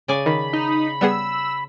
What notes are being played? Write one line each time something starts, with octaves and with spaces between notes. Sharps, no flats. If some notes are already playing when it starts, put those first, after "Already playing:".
C#3 D5 G#5
D#3 B5
D#4
G3 B3 G#4 E6